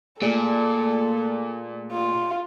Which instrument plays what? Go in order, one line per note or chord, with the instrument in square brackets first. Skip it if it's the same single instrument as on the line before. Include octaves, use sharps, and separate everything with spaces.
[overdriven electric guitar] A#2 [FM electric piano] A3 G#4 D5 [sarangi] A4
[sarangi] F4